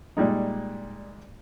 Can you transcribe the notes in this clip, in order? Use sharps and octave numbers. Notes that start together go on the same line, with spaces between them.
A#2 G3 G#3 D#4